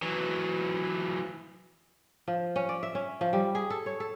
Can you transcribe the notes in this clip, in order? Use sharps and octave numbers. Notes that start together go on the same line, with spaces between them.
E3 F#3
F3
C#4
D5
E5
C#4
F3
G3
G#4
A4
C#5
A4